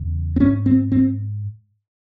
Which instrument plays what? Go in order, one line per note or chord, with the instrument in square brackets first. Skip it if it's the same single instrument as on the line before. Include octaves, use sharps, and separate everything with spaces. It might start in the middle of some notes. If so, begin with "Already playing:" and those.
Already playing: [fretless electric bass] E2 C#3
C4
G#2 C#4
C4
C4